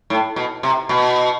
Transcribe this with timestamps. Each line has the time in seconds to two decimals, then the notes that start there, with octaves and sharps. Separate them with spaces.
0.10 A2
0.36 B2
0.63 C3
0.89 B2